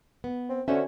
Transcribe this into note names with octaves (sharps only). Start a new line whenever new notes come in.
B3
C4
D3 C#4 F#4 C5 E5